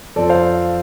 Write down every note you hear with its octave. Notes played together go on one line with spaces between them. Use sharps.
F2 F3 C4 A4 D5
C5 F5